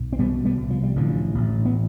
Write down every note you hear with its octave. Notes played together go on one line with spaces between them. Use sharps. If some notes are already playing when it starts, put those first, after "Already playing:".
Already playing: B1
C4
B2 G3 B3
G3 B3
C2
F3
G3
A1 D3 F3
A1
B3